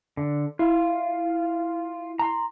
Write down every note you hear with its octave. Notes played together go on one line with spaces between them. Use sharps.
D3
E4 F4
A#5 C6